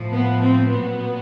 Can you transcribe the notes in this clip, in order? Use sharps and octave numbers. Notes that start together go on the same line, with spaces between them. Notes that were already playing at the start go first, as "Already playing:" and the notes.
Already playing: A2 F3
B3
C4
A#2 F#3 B3